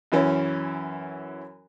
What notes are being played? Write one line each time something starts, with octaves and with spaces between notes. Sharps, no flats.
F#2 E3 C#4